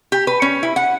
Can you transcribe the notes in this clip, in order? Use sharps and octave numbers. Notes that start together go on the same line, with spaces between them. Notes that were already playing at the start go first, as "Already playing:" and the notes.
G4
B4
C#4
E4
F#5